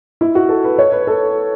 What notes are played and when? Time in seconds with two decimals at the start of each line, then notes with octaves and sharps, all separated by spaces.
0.21 E4
0.35 F#4
0.49 A4
0.64 B4
0.79 C#5
0.92 B4
1.07 A4